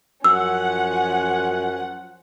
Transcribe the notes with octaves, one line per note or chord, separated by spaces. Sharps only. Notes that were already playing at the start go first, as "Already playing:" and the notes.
F#2 F3 C#4 F#5 E6